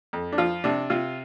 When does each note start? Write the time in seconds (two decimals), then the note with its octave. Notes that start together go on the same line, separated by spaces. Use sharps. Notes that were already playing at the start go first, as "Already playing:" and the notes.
0.13 F2
0.32 D4
0.38 F3 F4
0.64 C3 D4
0.90 C3 F4